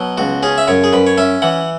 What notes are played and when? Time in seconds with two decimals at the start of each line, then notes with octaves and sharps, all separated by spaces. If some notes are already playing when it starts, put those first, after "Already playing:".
Already playing: B2 F#3
0.17 C#2 F#4
0.43 C#4 G#4
0.58 E5
0.67 F#2 C#5
0.84 G#4
0.93 F#2 B4
1.07 C#5
1.18 C#4 E5
1.42 E3 F#5